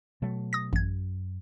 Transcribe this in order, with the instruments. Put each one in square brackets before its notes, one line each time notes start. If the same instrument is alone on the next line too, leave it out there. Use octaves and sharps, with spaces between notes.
[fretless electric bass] B2 F#3 A3
[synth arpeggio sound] D#6 A#6
[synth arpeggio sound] A1 G#6 [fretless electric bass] F#2